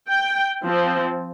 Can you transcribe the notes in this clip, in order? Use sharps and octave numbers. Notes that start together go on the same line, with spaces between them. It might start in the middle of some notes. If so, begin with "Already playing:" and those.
G5
F3 C4